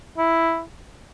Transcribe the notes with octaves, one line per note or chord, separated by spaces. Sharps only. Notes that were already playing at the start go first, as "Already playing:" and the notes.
E4